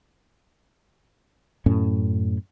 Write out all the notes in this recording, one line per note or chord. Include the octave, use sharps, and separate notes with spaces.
F#2 A2 C#4